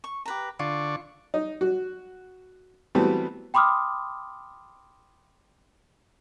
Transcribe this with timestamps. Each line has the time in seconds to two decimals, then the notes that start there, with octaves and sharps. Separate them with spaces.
0.04 C#6
0.26 G4 B4 A#5
0.59 D3 F4 D5 C#6
1.34 D#4
1.61 F#4
2.95 E3 F#3 G3 A3 B3 C4
3.54 G5 B5 C6 D6 D#6 F6